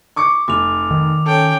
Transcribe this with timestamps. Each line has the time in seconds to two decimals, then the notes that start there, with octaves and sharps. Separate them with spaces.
0.16 C#6 D6 C#7
0.48 F1 D6 F7
0.91 D#3
1.26 C#4 A4 G5